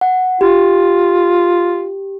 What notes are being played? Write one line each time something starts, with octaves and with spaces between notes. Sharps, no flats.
F#5
F4 G4